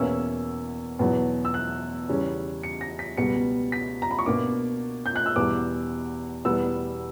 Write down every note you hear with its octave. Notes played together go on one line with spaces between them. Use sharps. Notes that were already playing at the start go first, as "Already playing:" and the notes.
Already playing: E2 B2 A#3 C#4 E4 E6
E2 B2 F#3 B3
E6
F#6
E2 C#3 G3 C#4
C#7
A#6
B6
C#2 B2 G3 B3 C#7
B6
A#5
B5
C#6
B2 A#3 D4 D6
G6
F#6
E6
E2 B2 G3 D6
E2 B2 G3 B3 E6